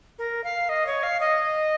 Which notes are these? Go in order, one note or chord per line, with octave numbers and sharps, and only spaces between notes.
A#4
F5
D#5
C#5
F5
D#5